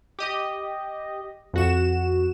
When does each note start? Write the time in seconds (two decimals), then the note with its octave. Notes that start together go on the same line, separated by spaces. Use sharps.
0.19 G4 D#5
1.54 F2 F#4 E7